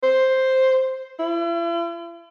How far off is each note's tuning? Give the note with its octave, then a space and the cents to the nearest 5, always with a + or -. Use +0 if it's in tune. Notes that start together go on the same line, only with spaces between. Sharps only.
C5 +0
E4 +45